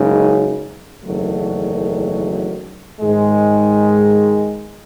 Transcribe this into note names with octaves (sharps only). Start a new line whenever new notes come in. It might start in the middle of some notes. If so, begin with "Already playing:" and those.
Already playing: F#1 F#2 C#3 G#3 D#4
F#1 E2 D#3 F#3 A3
G#2 D#3 G#3